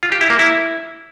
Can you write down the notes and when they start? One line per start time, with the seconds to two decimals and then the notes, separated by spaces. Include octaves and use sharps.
0.03 F4
0.12 G4
0.21 E4
0.30 A#3
0.39 E4